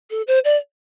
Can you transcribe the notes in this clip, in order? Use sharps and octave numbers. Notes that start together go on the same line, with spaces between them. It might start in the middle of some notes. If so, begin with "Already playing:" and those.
A4
C5
D5